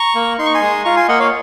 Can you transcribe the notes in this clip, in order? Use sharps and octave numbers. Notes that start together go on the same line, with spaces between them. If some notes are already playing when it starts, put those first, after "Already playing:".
Already playing: A#5 C#6
A#3
D#4 C6
C#6
G#5 C6
G#3
F4 A#5 C#6
G#5 C6
A#3 D#5 F#5
C#5 F5